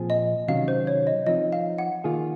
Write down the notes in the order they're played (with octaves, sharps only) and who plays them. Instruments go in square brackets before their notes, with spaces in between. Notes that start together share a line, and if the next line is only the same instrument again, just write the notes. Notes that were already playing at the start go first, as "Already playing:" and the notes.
Already playing: [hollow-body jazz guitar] A#2 F3 C4 F4 G#4
[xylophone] D#5
[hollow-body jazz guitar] C3 D#3 F#3 C#4 F#4 [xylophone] F5
[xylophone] C5
C#5
D#5
[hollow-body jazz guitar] F3 C4 D#4 [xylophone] D#5
[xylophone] F5
F#5
[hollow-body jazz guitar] D#3 A#3 F4 G#4